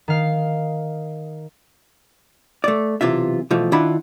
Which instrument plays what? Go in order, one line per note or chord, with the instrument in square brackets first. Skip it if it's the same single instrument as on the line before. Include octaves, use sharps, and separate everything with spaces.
[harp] D#3 F5
[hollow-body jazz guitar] A3 D5
B1 C3 E3 F4 E5
B2 E3 F3 A3
D#3 D4 E4 F4 F#5 B5